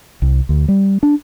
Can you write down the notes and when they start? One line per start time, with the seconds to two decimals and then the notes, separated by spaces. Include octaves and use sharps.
0.22 C2
0.49 D2
0.68 G3
1.03 D4